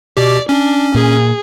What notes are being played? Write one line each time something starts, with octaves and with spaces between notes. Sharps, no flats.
B2 G4 D5
C#4 D4
A#2 G#4